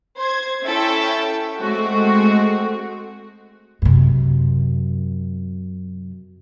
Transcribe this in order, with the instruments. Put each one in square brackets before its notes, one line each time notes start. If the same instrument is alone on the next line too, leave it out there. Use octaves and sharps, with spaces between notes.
[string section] C5 G#6
C#4 E4 A4 E5 G5
G#3 A3 C4 F#4
[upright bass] F#2 C3